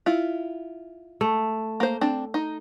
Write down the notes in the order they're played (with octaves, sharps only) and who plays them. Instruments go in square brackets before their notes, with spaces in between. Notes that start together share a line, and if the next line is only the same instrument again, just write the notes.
[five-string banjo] E4 F4
[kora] A3
[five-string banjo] A#3 C5
C4 D4
D#4